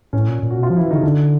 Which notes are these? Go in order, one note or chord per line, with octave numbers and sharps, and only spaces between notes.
A2 C#4
A#2
A#2
F#4
B2 F4
F3
E3 E4
D3 D#4
C#3
D3 D4